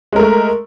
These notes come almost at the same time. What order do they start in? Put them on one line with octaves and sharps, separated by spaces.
G#3 A#4 A3